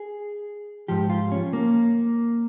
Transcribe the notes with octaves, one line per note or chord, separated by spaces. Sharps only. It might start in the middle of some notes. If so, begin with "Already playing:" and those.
Already playing: G#4
G#2 F3 G4
F4
C#4
A#3